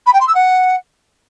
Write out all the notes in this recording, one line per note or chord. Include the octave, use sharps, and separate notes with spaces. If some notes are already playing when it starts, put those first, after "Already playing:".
B5
G5
C6
E6
F#5